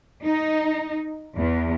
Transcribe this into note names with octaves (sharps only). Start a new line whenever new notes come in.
D#4
E2